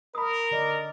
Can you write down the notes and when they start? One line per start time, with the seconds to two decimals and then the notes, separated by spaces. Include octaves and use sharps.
0.15 A#4 B5 D#6
0.51 D3 D5 D#5